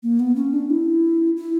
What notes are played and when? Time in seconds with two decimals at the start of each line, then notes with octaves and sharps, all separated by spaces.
0.03 A#3
0.20 B3
0.36 C#4
0.53 D4
0.70 E4
1.37 E4